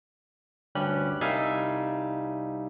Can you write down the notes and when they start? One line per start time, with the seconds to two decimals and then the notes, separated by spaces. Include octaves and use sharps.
0.75 D2 G2 G3 C#4 G4 F#6
1.21 C2 G3 D#4 E5 F5 G#5